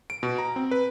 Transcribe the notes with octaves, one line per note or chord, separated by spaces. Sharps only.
D7
B2
A#5
C4
B4